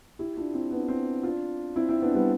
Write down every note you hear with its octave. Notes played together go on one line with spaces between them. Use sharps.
E4 G4
D4 F4
C4 E4
B3 D4
C4 E4
D4 F4
C4 E4
C4 E4
B3 D4
G3 B3